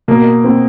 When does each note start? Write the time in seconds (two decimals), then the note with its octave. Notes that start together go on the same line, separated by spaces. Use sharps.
0.08 B2 A#3
0.44 C4